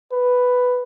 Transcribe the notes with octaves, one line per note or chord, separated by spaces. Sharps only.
B4